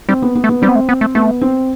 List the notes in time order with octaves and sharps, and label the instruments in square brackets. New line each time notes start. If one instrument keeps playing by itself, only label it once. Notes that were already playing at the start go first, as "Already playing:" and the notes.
[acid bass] G3 [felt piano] C4
[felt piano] B3
B3
[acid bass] A3
[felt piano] B3
[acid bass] G3 [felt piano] C4
[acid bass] B3
A3
B3
A3
[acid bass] A3 [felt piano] B3
[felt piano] C4